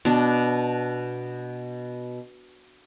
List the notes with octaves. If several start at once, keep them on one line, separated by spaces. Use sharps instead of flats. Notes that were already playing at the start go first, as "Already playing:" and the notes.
B2 D4